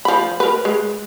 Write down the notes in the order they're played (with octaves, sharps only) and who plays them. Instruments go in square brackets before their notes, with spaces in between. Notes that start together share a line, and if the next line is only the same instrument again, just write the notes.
[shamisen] F3 B5
A#4 B4
G#3